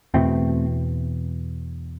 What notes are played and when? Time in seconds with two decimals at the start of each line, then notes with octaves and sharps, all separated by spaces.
0.14 E2 B2 A3 C4